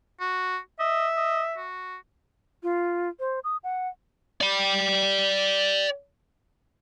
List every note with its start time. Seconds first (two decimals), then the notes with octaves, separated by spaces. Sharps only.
0.20 F#4
0.79 D#5 E5
1.16 D#5
1.57 F#4
2.63 F4
3.20 C5
3.44 D#6
3.63 F#5
4.41 D5 G5